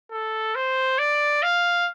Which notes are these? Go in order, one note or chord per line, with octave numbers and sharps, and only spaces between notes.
A4
C5
D5
F5